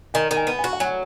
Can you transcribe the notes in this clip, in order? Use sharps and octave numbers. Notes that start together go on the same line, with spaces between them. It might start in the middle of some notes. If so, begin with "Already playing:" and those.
D#3 G#5
D#3
G#5
B3
G#5
F#4
F#5
F#3 G#5